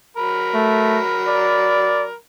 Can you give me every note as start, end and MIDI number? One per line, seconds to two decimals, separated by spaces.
0.17 2.14 54
0.17 2.14 70
0.17 2.14 83
0.55 1.00 57
1.28 2.06 74